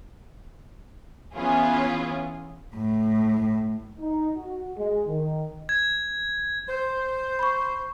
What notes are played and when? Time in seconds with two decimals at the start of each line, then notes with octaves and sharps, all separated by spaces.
1.35 E3 B3 C#4 E4 F4 G#4
2.75 A2
4.00 D#4
4.36 F#4
4.77 G#3
5.08 D#3
5.69 G#6
6.69 C5
7.39 B5 C#6